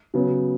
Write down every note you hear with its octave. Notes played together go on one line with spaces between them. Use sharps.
C#3 F#3 B3